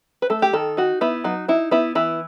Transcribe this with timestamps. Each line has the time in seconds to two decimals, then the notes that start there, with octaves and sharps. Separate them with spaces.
0.22 B4
0.30 A3 A4
0.42 G4
0.53 D#3 A4
0.77 D#4 F#4
1.01 B3 E4
1.24 F#3 D#4
1.48 D#4 E4
1.71 B3 E4
1.95 E3 E4